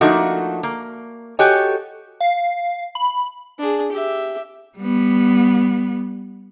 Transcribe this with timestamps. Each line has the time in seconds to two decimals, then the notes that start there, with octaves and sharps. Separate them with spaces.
0.01 F3 A3 A#3 D4 D#4 F#4
0.63 A#3
1.39 F#4 G4 A4 C#5 D#5 G#5
2.20 F5
2.95 B5
3.59 D4 G#4
3.92 G4 E5
4.78 G3 B3